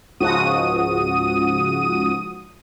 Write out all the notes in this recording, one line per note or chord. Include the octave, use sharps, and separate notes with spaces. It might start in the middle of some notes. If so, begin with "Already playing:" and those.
C#2 G#2 F3 F#4 D#6 D#7